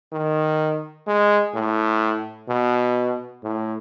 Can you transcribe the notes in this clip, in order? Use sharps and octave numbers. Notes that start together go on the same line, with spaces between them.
D#3
G#3
A2
B2
A2